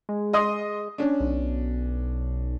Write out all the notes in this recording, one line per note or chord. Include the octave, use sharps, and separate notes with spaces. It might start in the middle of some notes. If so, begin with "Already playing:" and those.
G#3
D#5 C6 D#6
C#4 D4
B1